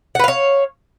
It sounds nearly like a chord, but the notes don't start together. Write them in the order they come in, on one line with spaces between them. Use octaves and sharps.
F#5 B4 F5 C#5